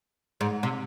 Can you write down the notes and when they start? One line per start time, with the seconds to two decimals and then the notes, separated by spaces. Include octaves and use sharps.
0.41 G#2
0.63 C3